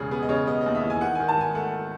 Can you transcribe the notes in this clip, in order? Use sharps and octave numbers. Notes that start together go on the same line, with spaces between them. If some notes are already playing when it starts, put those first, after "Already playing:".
Already playing: E1 C#3 G#4
B3 G#4
D#5
C#3 C#5
B3 D#5
D#2 D#5
E5
E3
G#5
D#3 F#5
D#3 G#5
A5
G#1 G#5
A3 F#5